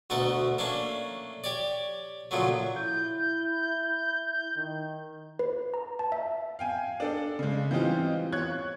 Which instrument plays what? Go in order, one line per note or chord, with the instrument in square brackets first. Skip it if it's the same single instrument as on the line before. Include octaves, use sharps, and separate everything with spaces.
[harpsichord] D2 B2 A3 A4 A#4 F#5
A3 A#3 C#4 D4 A4
G4 C#5 D5
A#2 C#3 F3 F#3 A3
[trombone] E4 [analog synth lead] G6
[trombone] D#3
[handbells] B4
A#5
A5
E5
[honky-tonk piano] F5 G5 G#5
D4 A4 D5
C#3 G#3
E3 G3 C4 D#4 F4
C#5 C#6 F#6 G#6